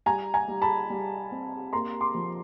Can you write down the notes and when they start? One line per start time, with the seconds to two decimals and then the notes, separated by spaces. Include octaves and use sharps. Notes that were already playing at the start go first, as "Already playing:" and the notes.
0.06 G3 G#5 A#5
0.34 G#5 A#5
0.48 G3
0.62 A5 B5
0.90 G3
1.31 C4
1.73 A#3 A#5 C6
2.01 C6 D6
2.14 F3